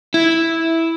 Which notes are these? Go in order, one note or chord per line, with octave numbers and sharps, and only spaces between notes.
E4